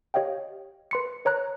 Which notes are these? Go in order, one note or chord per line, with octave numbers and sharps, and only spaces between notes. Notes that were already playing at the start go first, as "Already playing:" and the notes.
G4 C#5 D#5 F5 G5
B4 C6 C#7
B4 C#5 A#5 F#6